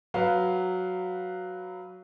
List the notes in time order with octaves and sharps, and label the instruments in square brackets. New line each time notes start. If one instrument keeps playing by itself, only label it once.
[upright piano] F#3 B4 F5